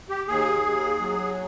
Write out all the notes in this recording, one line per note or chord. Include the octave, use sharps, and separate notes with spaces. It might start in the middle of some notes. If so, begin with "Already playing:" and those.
G4
D#2 G#4
D#2
F#3